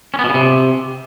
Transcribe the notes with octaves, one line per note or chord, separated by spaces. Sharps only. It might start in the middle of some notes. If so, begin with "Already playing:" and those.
C#4
B3
B2
C#3
C3